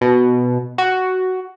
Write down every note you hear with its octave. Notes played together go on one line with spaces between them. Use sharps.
B2
F#4